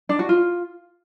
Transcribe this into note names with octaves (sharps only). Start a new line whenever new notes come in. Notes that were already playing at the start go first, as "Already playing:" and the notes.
D4
F#4
F4